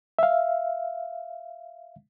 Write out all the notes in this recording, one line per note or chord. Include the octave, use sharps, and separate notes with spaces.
E5 F5